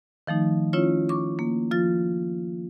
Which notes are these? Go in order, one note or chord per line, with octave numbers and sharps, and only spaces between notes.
D#3 F3 A3 D#4
C#4 E4 F4 C#5
C#6 D6
A#3
F3 F4 A6